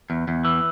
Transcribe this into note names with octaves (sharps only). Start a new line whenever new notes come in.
E2
E2
E3